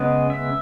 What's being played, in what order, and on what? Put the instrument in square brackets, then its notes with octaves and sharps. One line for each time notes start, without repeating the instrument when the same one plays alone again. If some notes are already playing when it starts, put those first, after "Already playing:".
Already playing: [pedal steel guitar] C#3 G#3 B3 D#5
E5